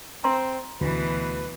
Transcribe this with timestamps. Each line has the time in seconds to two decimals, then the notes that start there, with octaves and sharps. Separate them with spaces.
0.24 C4 A#5 C6
0.81 D2 B2 E3 B4